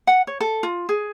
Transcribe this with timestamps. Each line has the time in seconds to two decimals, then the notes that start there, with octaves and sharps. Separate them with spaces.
0.07 F#5
0.27 C#5
0.40 A4
0.63 F4
0.89 G#4